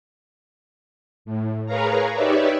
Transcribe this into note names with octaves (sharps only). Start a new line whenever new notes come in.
A2
G#4 A#4 B4 C#5 F5 A#5
D#4 G4 B4 C#5 D5 E5